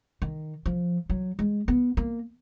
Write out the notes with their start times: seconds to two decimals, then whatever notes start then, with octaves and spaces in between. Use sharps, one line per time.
0.22 D#3
0.66 F3
1.10 F#3
1.39 G#3
1.68 B3
1.97 A#3